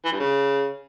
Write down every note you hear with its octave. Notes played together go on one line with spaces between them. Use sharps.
E3
G2
C#3